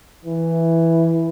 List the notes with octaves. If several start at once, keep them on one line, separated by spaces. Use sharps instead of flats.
E3